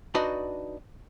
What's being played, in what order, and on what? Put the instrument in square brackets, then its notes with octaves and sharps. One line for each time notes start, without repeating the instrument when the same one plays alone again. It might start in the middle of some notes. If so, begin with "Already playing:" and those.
[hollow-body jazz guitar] D4 D#4 F#4 B4 D5 D#5